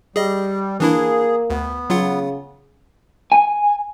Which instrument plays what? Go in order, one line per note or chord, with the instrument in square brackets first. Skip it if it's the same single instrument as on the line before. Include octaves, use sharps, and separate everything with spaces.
[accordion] G3 [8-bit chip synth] G#4 D#5
[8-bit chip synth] E3 D4 E4 [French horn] A#3 [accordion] G#4
[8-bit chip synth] D2 [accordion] B3
[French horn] C#3 [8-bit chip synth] F#3 F4 F#5
[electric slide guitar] G#5